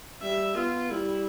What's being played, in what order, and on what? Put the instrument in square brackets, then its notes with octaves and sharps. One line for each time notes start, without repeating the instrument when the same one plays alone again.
[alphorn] G3 [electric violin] E5
[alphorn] B3 [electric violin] F4
[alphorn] G3 [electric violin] E4